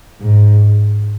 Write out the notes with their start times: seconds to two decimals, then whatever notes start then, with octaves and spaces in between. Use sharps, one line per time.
0.21 G#2